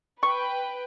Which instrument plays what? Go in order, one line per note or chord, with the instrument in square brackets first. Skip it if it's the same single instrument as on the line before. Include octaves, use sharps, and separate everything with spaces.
[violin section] B4 G5 [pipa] C#6